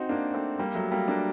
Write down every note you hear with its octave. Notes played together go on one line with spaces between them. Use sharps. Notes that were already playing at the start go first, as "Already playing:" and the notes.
Already playing: C4 D#4 F#4
A#3 D4
A3 C4
G3 A#3
F#3 A3
G3 A#3
A#3 D4